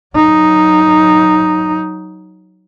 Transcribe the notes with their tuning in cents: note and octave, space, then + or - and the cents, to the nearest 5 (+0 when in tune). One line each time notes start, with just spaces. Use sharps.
F#3 +0 D#4 +0